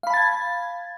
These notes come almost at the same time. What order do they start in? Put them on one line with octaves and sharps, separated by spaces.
F5 B5 A5 A6 G#6